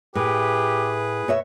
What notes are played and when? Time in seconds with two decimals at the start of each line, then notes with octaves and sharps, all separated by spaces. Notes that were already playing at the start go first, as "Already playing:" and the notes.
0.15 A2 G4 G#4 B4
1.28 B2 C#5 E5